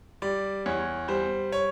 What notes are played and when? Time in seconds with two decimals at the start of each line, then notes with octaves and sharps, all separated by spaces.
0.22 G3 D5
0.66 E2 C#5
1.08 G3 C5
1.52 C#5